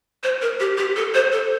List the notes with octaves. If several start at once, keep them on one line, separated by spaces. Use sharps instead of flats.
C5
A#4
G4
G4
A4
C5
A4